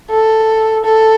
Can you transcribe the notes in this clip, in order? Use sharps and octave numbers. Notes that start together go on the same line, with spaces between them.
A4
A4